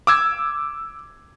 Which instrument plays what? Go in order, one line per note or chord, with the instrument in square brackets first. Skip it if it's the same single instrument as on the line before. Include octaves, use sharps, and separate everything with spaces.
[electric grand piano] D6 E6 G#6